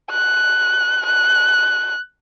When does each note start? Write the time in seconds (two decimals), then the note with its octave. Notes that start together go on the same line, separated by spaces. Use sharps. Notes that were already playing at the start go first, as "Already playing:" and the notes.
0.11 F#6
1.06 F#6